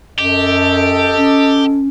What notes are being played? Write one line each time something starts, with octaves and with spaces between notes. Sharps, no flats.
F#2 G4 A4 D#5
C#4